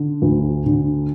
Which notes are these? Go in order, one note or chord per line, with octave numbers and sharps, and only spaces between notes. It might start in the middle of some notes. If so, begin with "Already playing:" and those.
Already playing: D3
D2
D3